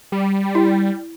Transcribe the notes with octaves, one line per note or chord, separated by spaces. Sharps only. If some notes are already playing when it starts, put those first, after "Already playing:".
G3
E4